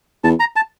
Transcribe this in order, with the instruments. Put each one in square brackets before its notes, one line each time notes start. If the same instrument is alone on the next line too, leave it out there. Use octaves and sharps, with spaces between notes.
[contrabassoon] E2 [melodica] A5
[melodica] A#5
A5